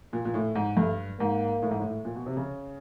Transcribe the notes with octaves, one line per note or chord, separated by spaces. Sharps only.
A#2
A#2
A2
G#2
G2 A3
G#2 A#3
A2
G#2
A2
A#2
B2
C3
C#3